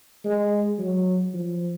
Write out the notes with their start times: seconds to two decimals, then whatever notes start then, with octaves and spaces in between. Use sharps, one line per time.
0.25 G#3
0.79 F#3
1.34 F3